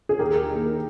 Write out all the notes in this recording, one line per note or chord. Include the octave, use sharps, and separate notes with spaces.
G#4
D#2 G4 A#4
D#3 A#3